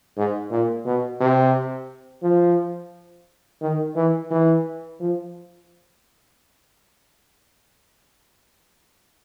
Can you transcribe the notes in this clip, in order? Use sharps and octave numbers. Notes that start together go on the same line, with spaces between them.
G#2
A#2
B2
C3
F3
D#3
E3
E3
F3